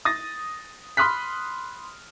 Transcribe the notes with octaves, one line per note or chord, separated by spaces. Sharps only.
D#6 A6 A#6
B5 C6 D#6 F6 F#6 B6